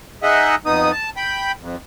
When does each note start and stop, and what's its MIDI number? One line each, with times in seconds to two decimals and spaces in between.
0.23 0.55 63
0.23 0.55 68
0.23 0.55 75
0.23 0.55 76
0.23 0.55 78
0.66 0.91 41
0.66 0.91 59
0.66 0.91 63
0.66 0.91 87
0.92 1.10 81
1.17 1.52 79
1.17 1.52 83
1.62 1.76 41